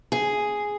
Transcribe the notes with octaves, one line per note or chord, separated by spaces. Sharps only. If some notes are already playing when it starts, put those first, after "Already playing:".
G#4